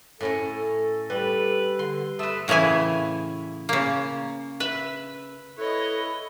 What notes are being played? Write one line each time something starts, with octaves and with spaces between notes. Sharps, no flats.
A2 C#4 A4 C#5
G3 B4
D3 C6
A3 B4 C6 D#6 E6
A2 C#3 E3 E4 G#5
C#3 A#3
B4 E5
E4 A4 B4 C#5 D#5